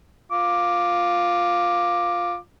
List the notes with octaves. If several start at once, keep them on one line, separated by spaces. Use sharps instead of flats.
F4 D6